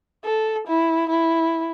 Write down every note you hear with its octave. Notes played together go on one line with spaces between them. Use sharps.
A4
E4
E4